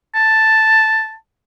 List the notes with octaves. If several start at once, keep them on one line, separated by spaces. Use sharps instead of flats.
A5